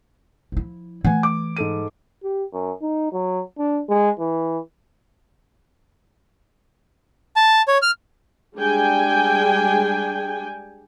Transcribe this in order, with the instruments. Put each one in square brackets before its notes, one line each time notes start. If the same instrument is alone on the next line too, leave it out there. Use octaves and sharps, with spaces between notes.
[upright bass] F3 E4
[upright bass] E3 A3 [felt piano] F#5 G#5
[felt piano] D6
G#2 A4 D#7
[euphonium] G4
F#2
D#4
F#3
D4
G#3
E3
[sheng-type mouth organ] A5
C#5
F6
[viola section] G3 G#3 D4 G#4 G5 G#5